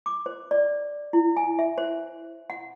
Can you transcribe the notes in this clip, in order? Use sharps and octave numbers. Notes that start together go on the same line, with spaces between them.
D6
C5
D5
E4
G#5
E5
C5
F#5